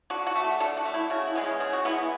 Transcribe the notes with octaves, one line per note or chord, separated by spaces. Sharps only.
D3 F#4
F#4
A3
A4
D3 A4
F#4
A3
E4
C#3 F#4
E4
G#3 B3
C#4
C#3 G#4
F#4
G#3 B3 E4
E4